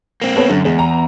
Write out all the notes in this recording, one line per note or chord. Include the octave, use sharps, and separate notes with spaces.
A#3 C4
B3 A4 C#5
F#2 D3
E2 G#3
A#5